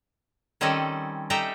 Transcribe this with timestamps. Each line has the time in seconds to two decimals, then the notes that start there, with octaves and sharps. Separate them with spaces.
0.61 D#3 G3 C4 C#4 A4 D#5
1.30 G3 D#4 A4 E5 G5 A#5